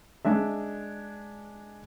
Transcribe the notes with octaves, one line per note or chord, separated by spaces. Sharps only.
G#3 D4 E5